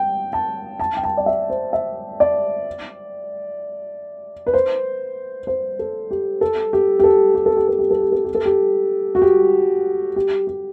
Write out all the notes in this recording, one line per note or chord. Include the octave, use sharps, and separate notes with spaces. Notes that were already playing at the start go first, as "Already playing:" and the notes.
Already playing: G5
A5
A5
G5
A5
D5
E5
C5
E5
D5
B4
C5
C5
A4
G4
A4
G4
G4
A4
G4
A4
G4
A4
G4
A4
G4
A4
G4
A4
G4
F#4
G4
G4
G4